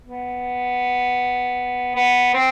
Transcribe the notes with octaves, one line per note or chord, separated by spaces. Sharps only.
B3
B3
C4